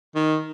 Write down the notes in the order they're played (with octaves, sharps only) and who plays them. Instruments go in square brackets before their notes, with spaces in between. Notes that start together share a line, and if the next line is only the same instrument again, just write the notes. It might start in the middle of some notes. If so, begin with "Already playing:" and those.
[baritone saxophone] D#3